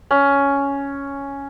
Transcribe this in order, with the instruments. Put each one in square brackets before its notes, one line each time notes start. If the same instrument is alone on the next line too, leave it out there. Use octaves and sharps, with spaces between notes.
[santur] C#4